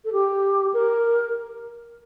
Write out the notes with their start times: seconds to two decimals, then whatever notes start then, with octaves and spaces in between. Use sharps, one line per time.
0.05 A4
0.12 G4
0.74 A#4